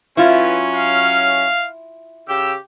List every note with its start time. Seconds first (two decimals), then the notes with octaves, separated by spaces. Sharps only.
0.17 F#3 C#4 E4 F4 B4
0.75 F5
2.29 C#3 G4 E6